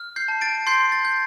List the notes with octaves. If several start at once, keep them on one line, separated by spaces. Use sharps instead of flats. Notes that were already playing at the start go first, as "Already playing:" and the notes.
Already playing: F6
G6 C7
A5
A6 D7
C6 G6 C7
A6
G6